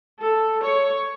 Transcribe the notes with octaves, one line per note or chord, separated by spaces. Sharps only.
A4
C#5